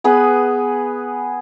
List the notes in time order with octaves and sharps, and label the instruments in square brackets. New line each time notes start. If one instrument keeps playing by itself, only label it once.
[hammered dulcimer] B3 G#4 B4